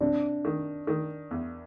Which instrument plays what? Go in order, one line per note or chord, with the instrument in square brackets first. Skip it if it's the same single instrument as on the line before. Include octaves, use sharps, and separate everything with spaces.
[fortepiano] C3 [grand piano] D4
[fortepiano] D#3
D#3
E2